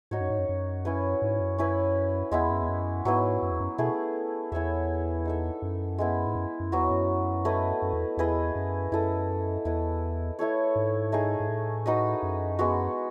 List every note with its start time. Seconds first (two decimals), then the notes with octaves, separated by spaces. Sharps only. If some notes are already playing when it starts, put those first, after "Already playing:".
0.11 G#2 D#4 F#4 C#5
0.20 F#2
0.30 G#2
0.39 F#2
0.49 F#2
0.85 C#4 E4 B4
1.22 G#2
1.40 F#2
1.58 C#4 E4 B4
2.31 E2 G#3 B3 E4
2.50 F#2
2.62 E2
2.69 F#2
3.05 G#2 F#3 B3 E4 B4
3.42 F#2
3.51 E2
3.60 F#2
3.78 B2 A3 E4 G#4
4.52 E2 E4 G#4 C#5 E5
5.25 D#4 A4 E5
5.62 F#2
5.98 G#3 B3 E4
6.26 G#2
6.35 F#2
6.60 F#2
6.72 E2 F#3 B3 F#4
6.90 F#2
7.45 A3 E4 B4 D#5
7.82 F#2
7.93 E2
8.17 E2 E4 G#4 B4 D#5
8.55 F#2
8.92 F#2 E4 A4 D#5
9.65 E2 E4 B4 D#5
10.39 A3 E4 A4 C#5
10.75 G#2
11.12 A3 D#4 G#4
11.40 G#2
11.49 A2
11.86 D#4 F#4 B4 D#5
12.23 F#2
12.59 G#3 B3 F#4